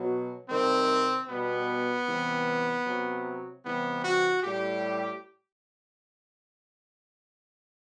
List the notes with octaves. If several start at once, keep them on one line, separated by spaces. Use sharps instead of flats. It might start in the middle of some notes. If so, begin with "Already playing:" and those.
Already playing: B2 F#3
C3 D#3 G3 C4
B2 G3 B3
C3 E3 G3
C3 F#3
C3 E3 G3 B3
F#4
A2 G3 G4